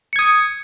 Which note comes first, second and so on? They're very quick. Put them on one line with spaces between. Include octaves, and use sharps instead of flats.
C#7 G#6 D#6